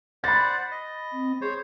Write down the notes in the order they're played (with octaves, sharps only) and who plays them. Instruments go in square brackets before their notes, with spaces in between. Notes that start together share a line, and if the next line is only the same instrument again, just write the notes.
[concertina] C5 D5 F#5 [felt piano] B5 A6
[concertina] D#5
[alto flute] C4
[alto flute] G#4 [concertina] C5 C#5